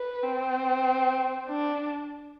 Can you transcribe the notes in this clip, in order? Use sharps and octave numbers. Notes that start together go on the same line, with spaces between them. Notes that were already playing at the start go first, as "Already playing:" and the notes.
Already playing: B4
C4
D4